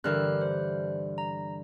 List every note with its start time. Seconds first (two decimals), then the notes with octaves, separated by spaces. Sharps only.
0.04 G2 D3 E3 A#4 F6 F#6
0.41 C5
1.18 A#5